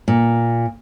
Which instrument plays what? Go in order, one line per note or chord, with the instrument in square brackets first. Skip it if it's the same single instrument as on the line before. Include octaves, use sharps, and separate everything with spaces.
[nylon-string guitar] A#2